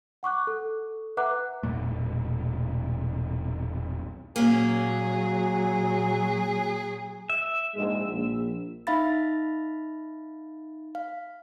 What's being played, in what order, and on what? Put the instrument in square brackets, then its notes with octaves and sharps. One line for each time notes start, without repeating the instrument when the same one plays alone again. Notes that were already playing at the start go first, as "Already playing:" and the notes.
[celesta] F#5 C#6 D6 F#6
A4
B4 E5 F#5 A#5 D6 F#6
[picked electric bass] E1 B1 A#2 A3
[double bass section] A#2 F#3 [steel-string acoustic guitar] A#3 C#4 [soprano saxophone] G#4
[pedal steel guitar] E5
[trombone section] A#1 G#2 G#3
A#1
[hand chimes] D#4 E5 F5 B5 A6
F5